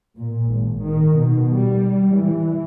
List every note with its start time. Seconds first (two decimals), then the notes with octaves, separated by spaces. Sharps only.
0.16 A#2
0.51 G#1
0.83 D#3
1.19 B2
1.54 G3
2.14 E3